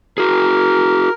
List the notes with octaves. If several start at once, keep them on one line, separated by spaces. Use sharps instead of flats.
F#4 G#4 A#4